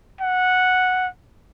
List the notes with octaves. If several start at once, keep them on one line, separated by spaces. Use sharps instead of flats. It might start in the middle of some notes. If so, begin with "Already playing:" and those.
F#5